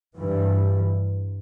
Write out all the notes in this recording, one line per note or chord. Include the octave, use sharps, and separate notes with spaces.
G2 E3 G3